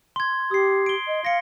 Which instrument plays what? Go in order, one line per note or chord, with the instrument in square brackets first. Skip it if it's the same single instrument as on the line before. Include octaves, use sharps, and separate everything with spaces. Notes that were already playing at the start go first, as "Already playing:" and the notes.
[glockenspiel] C6 G#6
[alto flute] G4 [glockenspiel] D#6 C7
[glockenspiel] D7 G7
[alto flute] D#5
[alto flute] F5 [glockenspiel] A#6 C#7